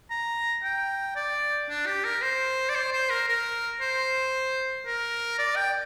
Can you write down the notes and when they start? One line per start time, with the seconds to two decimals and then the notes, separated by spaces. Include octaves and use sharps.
0.11 A#5
0.63 G5
1.16 D5
1.69 D4
1.86 G4
2.04 A#4
2.22 C5
2.69 D5
2.75 C5
2.93 C5
3.10 A#4
3.28 A#4
3.81 C5
4.86 A#4
5.39 D5
5.56 G5